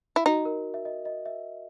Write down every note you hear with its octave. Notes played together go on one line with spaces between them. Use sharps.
E4
D#4 F#4
A#4
E5
D#5
D#5
E5